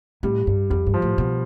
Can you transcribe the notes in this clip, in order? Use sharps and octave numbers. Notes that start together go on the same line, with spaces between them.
A2 G3
G2
F2 G3
G2
F3
A2
B2